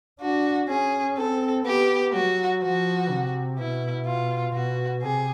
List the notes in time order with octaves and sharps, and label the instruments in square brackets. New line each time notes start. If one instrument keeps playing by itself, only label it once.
[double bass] D4 [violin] F#4
[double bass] C#4 [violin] G#4
[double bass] C4 [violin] A4
[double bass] B3 [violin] G4
[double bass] F#3 [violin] F#4
[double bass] F3 [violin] F#4
[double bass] C3
[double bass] B2 [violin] E4
[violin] F4
[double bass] B2 [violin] F#4
[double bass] C3 [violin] G#4